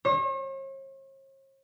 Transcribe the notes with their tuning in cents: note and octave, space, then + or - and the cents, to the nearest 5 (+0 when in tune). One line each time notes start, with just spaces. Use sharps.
C#5 -45